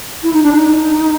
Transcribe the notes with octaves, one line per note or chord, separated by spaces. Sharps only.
E4
D#4
D4
D#4